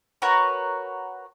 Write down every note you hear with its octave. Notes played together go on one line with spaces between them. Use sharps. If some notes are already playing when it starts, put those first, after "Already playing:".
F#4 A#4 B4 C#5